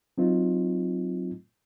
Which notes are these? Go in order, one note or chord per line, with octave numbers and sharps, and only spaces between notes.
F#3 C4 D#4 F4